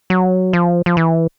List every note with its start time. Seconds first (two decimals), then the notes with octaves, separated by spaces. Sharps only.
0.10 F#3
0.53 F3
0.86 F3
0.97 E3